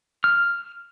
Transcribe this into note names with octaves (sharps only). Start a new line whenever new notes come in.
F6